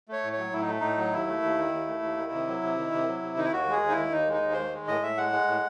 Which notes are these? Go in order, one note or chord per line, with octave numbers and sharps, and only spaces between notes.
A3 C#5
A2
C#5
F#3
A2 E4
D#4
A3
A2 D#4
F#3
D#2 E4
A3
D#2
D#3
D#2
A3
D#2
D#3
C3
F#3
C3
D#3
C3
F#3
C3
D#3 D#4
E4
D#2 F#4
G#3 G#4
D#2
D#4
E4
D#3
D#2 D#4
G#3 D#4
D#2
D#3 C5
G#3
A2 D#5
A2 E5
G#3 F#5
G#3
A2